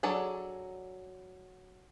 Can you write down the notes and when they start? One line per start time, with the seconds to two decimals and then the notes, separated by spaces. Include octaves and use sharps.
0.03 F#3 D4 G#4 A4 D5